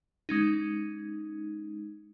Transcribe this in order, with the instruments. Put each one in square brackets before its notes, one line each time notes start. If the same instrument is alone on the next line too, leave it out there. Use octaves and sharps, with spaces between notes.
[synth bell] G#3 C#4 D#4